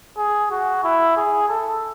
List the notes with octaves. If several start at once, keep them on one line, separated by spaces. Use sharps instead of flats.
G#4
F#4
E4
G#4
A4